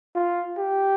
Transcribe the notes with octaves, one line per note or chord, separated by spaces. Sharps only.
F4
G4